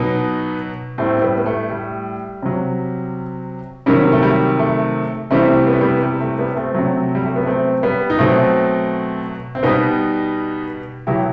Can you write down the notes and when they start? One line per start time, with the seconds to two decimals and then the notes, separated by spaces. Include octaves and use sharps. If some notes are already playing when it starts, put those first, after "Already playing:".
Already playing: B2 F#3 B3 D#4
0.98 A2 G3 A3 C4
1.17 C4
1.22 G3 B3
1.38 B3
1.46 A3
1.70 G3
2.42 C3 F#3
3.86 C3 D#3 F#3 G3
4.12 A3
4.23 G3
4.59 A3
5.31 C3 E3 G3 A3 C4
5.67 B3
5.74 A3
5.81 G3 B3
6.03 G3
6.20 A3
6.39 G3 B3
6.56 A3 C4
6.75 C3 F#3
7.15 G3
7.25 A3
7.36 B3
7.47 A3 C4
7.83 G3 B3
8.10 D#4
8.19 B2 F#3 A3 C4
9.55 C4
9.63 B2 G3 B3 D#4
11.07 B2 F#3 E4 G4